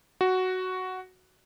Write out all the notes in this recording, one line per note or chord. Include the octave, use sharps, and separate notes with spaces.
F#4